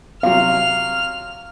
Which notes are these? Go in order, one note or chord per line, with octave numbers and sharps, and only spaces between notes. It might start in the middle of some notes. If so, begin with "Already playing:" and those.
C3 F#3 F5 F6